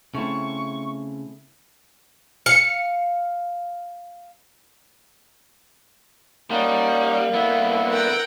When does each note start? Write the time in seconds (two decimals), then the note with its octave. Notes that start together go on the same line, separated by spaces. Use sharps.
0.15 C#3 A3 C4 E4 C#6
2.46 F5 C#7
6.51 G3 A#3 C#4 D#4 F#5
7.34 D3 B3 E4
7.90 A#4 F#5 G5